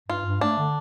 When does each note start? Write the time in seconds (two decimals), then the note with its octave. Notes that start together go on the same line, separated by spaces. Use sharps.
0.09 G2 F4
0.25 G2
0.41 A3 D4
0.58 D3